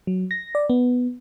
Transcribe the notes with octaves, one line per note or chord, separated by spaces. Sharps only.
F#3
A#6
D5
B3